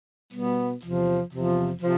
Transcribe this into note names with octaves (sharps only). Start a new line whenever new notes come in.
B2 G3 B3
E2 C3 F3
E2 C3 F3
C3 F3